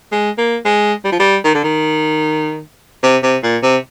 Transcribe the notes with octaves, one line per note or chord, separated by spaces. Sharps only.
G#3
A#3
G#3
G3
F3
G3
D#3
D3
D#3
C3
C3
A#2
C3